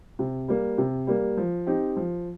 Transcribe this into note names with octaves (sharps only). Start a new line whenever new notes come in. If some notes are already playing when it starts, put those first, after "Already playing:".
C3
G3 A#3
C3
G3 A#3
F3
C4 D#4 G4
F3